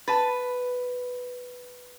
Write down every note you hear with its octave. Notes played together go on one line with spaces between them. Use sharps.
B4 A5 A6